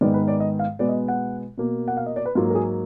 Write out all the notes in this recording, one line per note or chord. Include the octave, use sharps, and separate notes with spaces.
G#2 D#3 G#3 B3 D5
B4
D5
D#5
F5
B2 G#3 B3 D5
D#5
F#5
B2 A#3
F#5
F5
D#5
D5
B4
G#2 F#3 A#3 F4
A#4
G#4